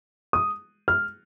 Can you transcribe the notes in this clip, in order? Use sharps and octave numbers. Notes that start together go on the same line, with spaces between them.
D#6
F6